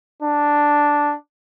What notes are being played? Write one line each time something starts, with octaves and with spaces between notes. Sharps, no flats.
D4